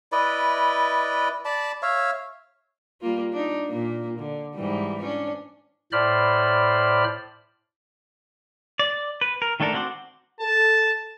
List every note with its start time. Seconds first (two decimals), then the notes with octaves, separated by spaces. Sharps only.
0.12 E4 B4 D5 D#5
1.45 D5 A5 B5
1.82 C#5 E5 F5
3.01 G3 A#3 F4
3.32 D4 D#4
3.67 A#2 A#3
4.18 D3
4.54 G#2 E3 G3
5.03 C#4 D4
5.92 A2 C5 D5 B5 F6
8.79 D5
9.21 B4
9.42 A#4
9.60 D#3 A3 D4 A4 A#4
9.73 C4 F#4 F#5 C6 D6
10.41 A4 A5